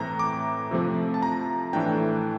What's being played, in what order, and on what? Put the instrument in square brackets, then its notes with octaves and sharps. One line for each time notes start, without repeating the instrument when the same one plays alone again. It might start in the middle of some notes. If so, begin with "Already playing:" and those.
Already playing: [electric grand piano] A2 E3 A3 C4 A#5
D6
C3 F3 A3 C4
A5
A#5
A2 E3 A3 D4 G5